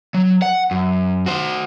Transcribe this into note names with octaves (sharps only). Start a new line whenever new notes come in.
F#3
F#5
F#2
F#4 C5